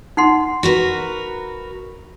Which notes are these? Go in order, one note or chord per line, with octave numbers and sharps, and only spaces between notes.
D#4 F#5 C6
F#4 A#4 B4